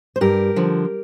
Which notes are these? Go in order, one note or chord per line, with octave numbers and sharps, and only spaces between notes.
C5
G2 G4 A#4
D3 F3